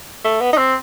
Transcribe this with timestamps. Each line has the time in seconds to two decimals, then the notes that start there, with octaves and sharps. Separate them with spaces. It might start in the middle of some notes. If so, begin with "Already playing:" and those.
0.25 A3
0.41 B3
0.53 D#4
0.58 C4